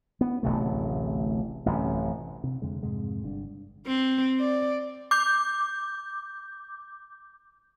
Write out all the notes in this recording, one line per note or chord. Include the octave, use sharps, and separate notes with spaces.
B3
D1 A1 C3 A3
A1 F#2 C3
C3
F2 D3 G#3
F2 G#2 C3 G#3
G1 G2 D4
C4
D5
D6 G6